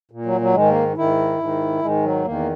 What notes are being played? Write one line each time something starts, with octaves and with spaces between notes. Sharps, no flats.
A#2
F#3
F#3
G#2 D#3 G#3
A#3
G#2 D#3 E4
G#2 D#3
G#2 D#3 G#3
F#3
E2 D#3 A#3